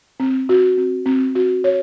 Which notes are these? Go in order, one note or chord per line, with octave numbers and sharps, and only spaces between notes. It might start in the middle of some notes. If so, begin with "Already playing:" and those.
C4
F#4
C4
C4
F#4
C#5